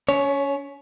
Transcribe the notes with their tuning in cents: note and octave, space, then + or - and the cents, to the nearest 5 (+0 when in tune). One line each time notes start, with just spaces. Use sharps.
C#4 +30 C#5 +0